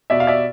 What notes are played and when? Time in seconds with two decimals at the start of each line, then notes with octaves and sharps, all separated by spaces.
0.10 B2 D5 E5
0.20 F5
0.27 D5 E5